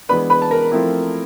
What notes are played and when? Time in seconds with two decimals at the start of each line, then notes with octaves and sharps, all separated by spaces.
0.09 E3 G#3 B3 D4 B4 B5
0.30 B4 B5
0.42 A5
0.51 A#4 A#5
0.72 F3 A3 C4 E4